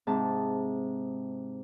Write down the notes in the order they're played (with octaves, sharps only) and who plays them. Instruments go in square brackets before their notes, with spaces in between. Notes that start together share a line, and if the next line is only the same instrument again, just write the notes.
[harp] G#2 C3 A5